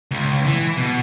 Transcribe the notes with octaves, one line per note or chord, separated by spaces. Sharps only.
C#2
E3
B2